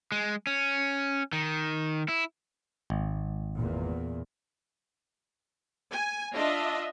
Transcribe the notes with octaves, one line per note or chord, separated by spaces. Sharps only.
G#3
C#4
D#3
E4
G#1
E2 A#2
G#5
D4 F4 D#5 E5